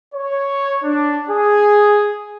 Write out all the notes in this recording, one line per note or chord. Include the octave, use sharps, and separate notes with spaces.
C#5
D4
G#4